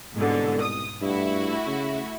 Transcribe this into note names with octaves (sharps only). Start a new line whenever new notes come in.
C2 G#2 B2 D3
D#6
G2 A3 E4 F#4
C#3